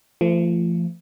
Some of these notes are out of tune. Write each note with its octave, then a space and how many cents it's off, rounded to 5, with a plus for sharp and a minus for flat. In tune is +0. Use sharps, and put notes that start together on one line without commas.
F3 -30 A3 +20